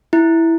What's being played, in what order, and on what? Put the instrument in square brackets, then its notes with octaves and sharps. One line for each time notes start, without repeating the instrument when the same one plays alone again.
[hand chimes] E4